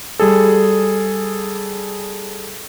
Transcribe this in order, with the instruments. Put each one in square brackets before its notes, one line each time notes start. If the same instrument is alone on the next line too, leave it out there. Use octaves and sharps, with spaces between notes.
[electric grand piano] G3 G#4 A4